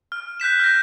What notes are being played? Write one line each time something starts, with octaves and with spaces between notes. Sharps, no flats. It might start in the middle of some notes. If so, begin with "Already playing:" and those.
F6
F#6 G6 B6 E7
F6 G6 A#6